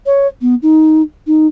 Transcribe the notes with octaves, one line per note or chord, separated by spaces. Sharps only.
C#5
B3
D#4
D#4